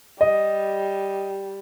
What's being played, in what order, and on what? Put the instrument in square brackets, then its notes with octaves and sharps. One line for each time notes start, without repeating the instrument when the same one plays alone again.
[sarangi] G3 [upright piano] D#5